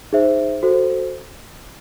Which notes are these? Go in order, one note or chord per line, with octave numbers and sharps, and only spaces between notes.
D#4 G#4 C5 E5
F#4 A4 C5